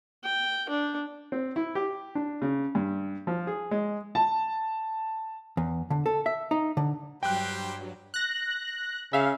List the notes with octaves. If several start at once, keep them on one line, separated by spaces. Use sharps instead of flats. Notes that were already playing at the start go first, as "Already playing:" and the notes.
G5
D4
C4
E4
G4
D4
C#3
G2
F3
G#4
G#3
A5
E2
D3
A4
E5
D#4
D3
G2 F#3 G3 G4 C5 G5 F#6
F#6 A#6
C#3 E5 F5